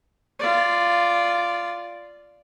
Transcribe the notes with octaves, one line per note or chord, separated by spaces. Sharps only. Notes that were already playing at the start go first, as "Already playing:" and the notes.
F4 D5